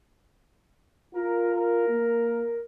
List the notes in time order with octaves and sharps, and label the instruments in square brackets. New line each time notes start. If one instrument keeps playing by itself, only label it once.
[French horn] F4 [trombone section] A#4
[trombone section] A#4
[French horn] A#3